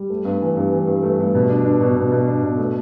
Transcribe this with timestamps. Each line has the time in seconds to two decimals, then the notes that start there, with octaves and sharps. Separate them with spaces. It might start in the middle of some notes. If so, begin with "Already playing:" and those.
Already playing: G3
0.10 A3
0.25 G2
0.42 E3
0.57 G2
0.72 E3
0.87 G2
1.03 A3
1.19 G2
1.35 B2
1.49 D4
1.65 D4
1.80 B2
1.96 B2
2.12 B2
2.28 D4
2.43 B2
2.58 A3